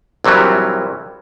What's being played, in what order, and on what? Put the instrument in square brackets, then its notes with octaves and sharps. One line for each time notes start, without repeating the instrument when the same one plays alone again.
[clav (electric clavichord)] A#1 C3 E3 F#3 G3